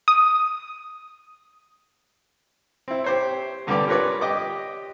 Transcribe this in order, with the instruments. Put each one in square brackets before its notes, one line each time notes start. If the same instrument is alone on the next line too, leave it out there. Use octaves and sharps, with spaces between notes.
[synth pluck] D#6
[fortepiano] C4 E4
G4 C5 C#5
E2 D3 G3 B3 G4 D5
F4 A#4 B4 C#5 D5
G4 D#5 D6